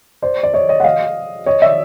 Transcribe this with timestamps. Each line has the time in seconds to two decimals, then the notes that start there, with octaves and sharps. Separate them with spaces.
0.22 C5 D5
0.43 D5
0.54 C#5 D#5
0.69 C#5 D#5
0.80 F#5
0.84 D#5 F5
1.46 C#5 D#5
1.62 D5 E5